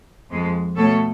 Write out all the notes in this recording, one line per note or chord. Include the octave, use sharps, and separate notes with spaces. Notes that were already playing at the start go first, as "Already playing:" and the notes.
F2 F3 G#3
B2 A3 A4 C#5